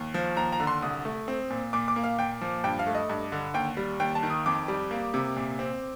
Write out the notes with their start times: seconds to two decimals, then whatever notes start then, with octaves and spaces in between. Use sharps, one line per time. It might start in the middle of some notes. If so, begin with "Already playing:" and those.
Already playing: D#2
0.14 F3
0.37 D#2 A#5
0.52 A#5
0.60 D3
0.67 C6
0.82 C2 D#6
1.05 A3
1.28 C4
1.50 A#2
1.73 A#2 D6
1.88 D6
1.96 A#3
2.04 F5
2.18 A#2 G5
2.41 F3
2.64 G2 G5
2.79 F5
2.87 A3
2.95 D#5
3.09 G2
3.32 D3
3.54 D#2 G5
3.77 G3
4.00 D#2 G5
4.15 A5
4.23 D#3
4.30 D#6
4.46 F2 D6
4.68 G3
4.91 A#3
5.14 C3
5.36 A#2
5.59 C4